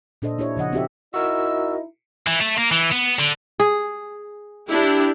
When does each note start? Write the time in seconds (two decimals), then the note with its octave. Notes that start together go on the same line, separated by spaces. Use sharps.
0.22 A#2 D4 A4 C5 D#5
0.38 D4 E4 G4 C#5
0.57 C#3 F3 D#5 F#5
0.73 C4 D#4 F#4 G4 A4 E5
1.14 D#4 E4 F#4 A#4 D#5 E6
2.27 E3
2.41 A3
2.58 A#3
2.71 E3
2.92 B3
3.19 D3
3.60 G#4
4.68 D4 E4 G4